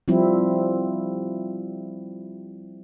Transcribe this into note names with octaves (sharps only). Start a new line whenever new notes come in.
F3 G3 C4 E4